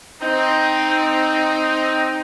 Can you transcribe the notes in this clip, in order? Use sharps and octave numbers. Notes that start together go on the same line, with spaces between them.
C4 D#4